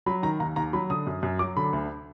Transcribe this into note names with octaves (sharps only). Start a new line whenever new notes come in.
F#3 B5
D#3 A#5
D#2 A#5
D#2 A#5
F#3 B5
D3 D#6
F#2
F#2
F#3 D6
D3 B5
D2